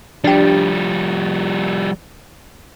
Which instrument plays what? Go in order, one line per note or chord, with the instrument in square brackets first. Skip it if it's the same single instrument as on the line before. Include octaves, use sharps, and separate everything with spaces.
[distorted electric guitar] F3 G3 [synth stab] D4 G4